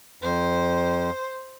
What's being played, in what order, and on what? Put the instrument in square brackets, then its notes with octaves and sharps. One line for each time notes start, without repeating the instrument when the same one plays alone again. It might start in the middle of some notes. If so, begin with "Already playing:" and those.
[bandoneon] F2 [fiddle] C5